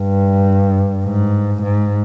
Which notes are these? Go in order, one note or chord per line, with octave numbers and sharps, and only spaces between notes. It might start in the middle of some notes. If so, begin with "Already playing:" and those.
Already playing: G2
G#2
G#2